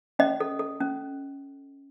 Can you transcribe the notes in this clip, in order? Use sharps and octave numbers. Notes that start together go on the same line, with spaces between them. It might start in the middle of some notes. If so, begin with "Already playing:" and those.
C#4 D#5
A4
A4
C#4